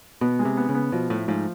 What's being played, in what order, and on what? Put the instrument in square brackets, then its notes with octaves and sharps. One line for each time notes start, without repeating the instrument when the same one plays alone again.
[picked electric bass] B2 [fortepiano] B3
[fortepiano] G#3
[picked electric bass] C3
[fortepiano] B3
[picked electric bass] C#3
[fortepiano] B3
[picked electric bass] B2 [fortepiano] F3
[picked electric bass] A2 [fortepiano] A3
[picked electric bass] G#2 [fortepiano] F3